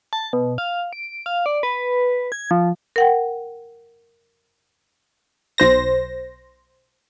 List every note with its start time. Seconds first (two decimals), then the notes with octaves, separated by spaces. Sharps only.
0.13 A5
0.33 B2
0.58 F5
0.93 D7
1.26 F5
1.46 D5
1.63 B4
2.32 G#6
2.51 F3
2.96 A#4 F#5 G5
5.58 B1 C5 A#6